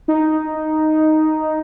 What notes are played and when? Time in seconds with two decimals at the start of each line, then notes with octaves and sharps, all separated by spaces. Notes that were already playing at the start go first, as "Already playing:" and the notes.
0.08 D#4